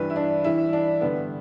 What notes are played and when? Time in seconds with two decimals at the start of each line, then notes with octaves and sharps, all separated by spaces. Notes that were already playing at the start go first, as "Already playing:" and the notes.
Already playing: G2 E3 B4
0.10 E4
0.16 D4
0.44 G2 E3 E4
0.73 D4
1.01 G2 D3 B3